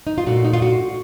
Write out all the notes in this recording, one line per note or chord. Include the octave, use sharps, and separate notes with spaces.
D#4
F4
A#2 A3 F#4
D#4
F4
F#4